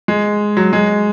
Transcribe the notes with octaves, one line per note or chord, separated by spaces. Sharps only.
G#3
F#3
G#3